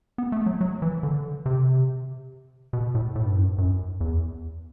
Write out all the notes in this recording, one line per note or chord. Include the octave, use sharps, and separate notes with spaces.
B3
A3
F#3
F#3
E3
D3
C3
B2
A2
A2
G2
F#2
G2
F#2
E2